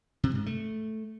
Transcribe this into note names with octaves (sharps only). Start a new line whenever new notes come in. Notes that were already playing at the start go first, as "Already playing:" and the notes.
C3
G#2
A3